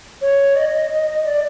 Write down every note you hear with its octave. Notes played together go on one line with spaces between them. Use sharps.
C#5
D#5
D5